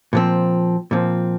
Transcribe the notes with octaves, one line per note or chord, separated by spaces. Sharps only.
A#2 F3 C4
A#2 F3 C4